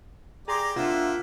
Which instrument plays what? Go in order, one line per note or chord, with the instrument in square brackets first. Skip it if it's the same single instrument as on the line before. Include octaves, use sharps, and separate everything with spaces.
[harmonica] G4 D5 [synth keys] G#4 C6 [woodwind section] A#5
[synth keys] C3 F4 E7 [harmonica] A#3 [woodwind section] D4 E5 F#5